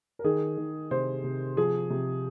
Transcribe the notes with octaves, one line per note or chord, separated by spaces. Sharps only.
A#4
D#3 G#4
D#3
C3 C5
C3
F3 G#4
C3